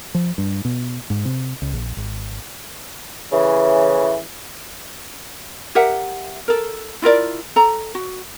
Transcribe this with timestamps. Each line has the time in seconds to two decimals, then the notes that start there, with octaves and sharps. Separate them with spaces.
0.15 F3
0.38 G2
0.65 B2
1.10 G#2
1.25 C3
1.62 C#2
1.73 A#1
1.97 G#1
3.32 A2 C#3 E3
5.75 G4 A#4 E5 F#5
6.48 A4 A#4
7.02 E4 F4 A#4 D5
7.56 A4 A#5
7.95 F#4